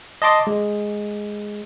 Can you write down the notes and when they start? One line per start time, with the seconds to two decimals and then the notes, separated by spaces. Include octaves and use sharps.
0.22 D#5 A5 C6 D6
0.47 G#3